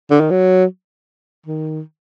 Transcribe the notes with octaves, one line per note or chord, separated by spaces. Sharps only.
D3
D#3
F#3
D#3